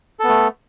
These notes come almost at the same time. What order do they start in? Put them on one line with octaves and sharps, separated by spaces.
A4 B3 A3